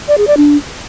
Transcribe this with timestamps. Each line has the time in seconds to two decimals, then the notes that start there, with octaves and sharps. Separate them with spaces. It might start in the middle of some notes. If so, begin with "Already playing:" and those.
0.08 D5
0.18 G#4
0.27 D5
0.37 D4